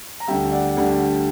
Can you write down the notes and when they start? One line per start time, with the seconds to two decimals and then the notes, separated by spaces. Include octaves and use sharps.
0.20 A#5
0.28 D2 D3 G3 E5 G5
0.52 D5 F#5
0.76 D2 D3 G3